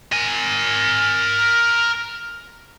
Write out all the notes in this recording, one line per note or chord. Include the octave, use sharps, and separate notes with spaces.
A#4 G#5